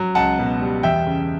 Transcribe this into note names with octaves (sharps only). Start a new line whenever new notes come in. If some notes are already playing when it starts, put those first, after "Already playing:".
Already playing: F#3
C#2 F#5 A5
B2
G3
E2 E5 G5
C#3